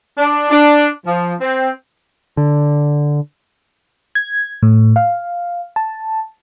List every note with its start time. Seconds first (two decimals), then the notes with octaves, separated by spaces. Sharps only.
0.17 D4
0.50 D4
1.06 F3
1.41 C4
2.37 D3
4.15 G#6
4.63 A2
4.96 F5
5.76 A5